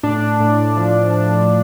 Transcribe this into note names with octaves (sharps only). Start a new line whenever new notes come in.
A2 D4
A2
F3